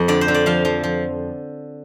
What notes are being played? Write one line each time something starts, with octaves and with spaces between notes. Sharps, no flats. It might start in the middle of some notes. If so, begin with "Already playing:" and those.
Already playing: F2
D3 D5
C5
D3
D5
F3 F5
F3
F3